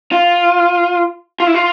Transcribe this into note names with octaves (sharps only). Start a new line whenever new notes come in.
F4
F4
E4
F4